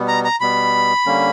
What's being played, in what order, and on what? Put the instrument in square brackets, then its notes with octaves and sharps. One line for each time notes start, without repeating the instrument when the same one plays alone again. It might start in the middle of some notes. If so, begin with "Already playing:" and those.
Already playing: [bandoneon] B2 G3 B3
[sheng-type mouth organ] A#5
A#5
[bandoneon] B2 G3 B3 [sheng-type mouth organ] B5
[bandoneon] D3 G3 A#3 C#4